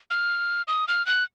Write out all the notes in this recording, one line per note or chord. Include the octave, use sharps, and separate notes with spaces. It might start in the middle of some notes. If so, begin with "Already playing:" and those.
F6
D#6
F6
F#6